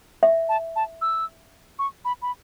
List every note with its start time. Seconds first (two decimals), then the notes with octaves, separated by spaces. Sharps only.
0.23 E5
0.49 A5
0.76 A5
1.01 E6
1.79 C#6
2.05 B5
2.22 B5